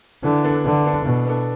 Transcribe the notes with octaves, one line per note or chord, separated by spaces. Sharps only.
D3 E3
B3 D4 A4
D3 E3
B3 D4 A4
B2 E3
B3 D4 A4